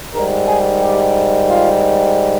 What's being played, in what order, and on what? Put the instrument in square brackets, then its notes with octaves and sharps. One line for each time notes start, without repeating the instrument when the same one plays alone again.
[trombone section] G#2 D#3 G3 A#4
G#4
G4
F4